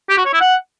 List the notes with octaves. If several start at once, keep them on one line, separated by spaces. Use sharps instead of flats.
G4
F#4
C#5
E4
F#5